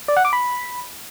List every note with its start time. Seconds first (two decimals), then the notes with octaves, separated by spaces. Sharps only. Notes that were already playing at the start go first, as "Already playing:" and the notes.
0.08 D5
0.17 F#5
0.25 D6
0.33 B5